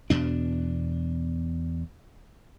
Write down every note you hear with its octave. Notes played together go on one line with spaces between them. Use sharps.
E2 B2 D4